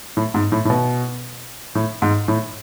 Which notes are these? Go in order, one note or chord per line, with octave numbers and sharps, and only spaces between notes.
A2
G#2
A2
A2
B2
A2
G#2
A2